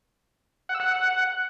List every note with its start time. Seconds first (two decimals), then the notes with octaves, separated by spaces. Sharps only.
0.69 F#5
0.75 E6
0.80 F#5